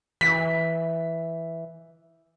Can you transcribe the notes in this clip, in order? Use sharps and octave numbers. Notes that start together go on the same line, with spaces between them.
E3 B6